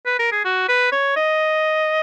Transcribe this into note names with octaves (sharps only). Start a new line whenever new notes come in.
B4
A#4
G#4
F#4
B4
C#5
D#5